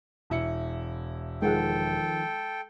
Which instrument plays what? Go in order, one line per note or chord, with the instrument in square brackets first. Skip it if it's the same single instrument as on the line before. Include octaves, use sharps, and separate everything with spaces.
[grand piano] E1 E4 C#7
[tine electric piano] D#3 F3 [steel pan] G#3 F#5 [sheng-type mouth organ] A4 G5